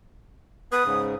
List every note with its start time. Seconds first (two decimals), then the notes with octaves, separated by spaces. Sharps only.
0.72 B3 B4 D#6
0.85 G#2 C#3